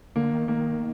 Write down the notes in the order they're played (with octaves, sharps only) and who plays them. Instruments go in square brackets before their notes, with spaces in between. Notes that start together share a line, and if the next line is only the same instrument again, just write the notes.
[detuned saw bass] D3 [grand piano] A#3
[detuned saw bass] D#3
[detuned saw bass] D#3 [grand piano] A#3